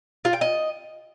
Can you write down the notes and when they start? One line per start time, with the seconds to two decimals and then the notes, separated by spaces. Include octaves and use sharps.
0.25 F4
0.33 G5
0.41 D#5